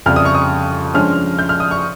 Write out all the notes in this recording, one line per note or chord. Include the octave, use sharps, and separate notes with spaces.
F2 C#3 G3 F6
D#6
C#6
D#6
G2 F3 G#3 C#4 F6
G6
F6
D#6
C#6